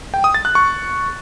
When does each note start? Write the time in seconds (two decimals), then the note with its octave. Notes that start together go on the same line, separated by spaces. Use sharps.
0.14 G5
0.24 D#6
0.34 A6
0.45 F#6
0.55 C#6